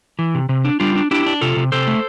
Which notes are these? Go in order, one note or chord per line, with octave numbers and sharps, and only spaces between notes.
E3
C3
C3
D4
G3 D4 F4
D4
D4 E4 G4
D4
C3 F4 A4
C3
C3 A4 C5
A3